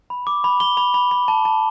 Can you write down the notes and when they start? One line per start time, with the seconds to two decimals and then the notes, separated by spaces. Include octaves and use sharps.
0.10 B5
0.27 D6
0.44 B5
0.60 B5 G7
0.77 B5
0.94 B5
1.11 B5
1.28 A5
1.45 A5